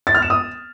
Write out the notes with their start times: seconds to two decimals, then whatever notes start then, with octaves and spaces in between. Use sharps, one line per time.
0.07 A6
0.15 F6
0.22 E7
0.30 D#6